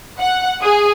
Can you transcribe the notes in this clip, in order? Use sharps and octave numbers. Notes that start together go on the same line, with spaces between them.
F#5
G#4